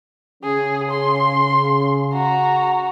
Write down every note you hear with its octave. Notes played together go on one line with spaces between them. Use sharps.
C#3 G#4
C6
F#4 A#5